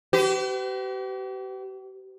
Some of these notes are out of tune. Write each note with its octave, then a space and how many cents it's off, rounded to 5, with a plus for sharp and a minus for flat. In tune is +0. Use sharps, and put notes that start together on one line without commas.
G4 -40 B4 +40